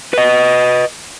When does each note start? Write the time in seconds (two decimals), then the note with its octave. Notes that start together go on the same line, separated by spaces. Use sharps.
0.13 B4 D#5